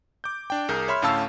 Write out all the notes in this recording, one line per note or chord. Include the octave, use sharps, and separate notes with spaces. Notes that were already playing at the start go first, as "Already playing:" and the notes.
D6 G6
D4 G5
C2 G#4 A#4 G6
C#5 E5 B5 C6 F6
D2 A2 C#4 F5 A5 E6